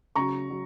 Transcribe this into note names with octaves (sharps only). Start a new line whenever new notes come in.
C#3 F#3 A#5 C#6
F#3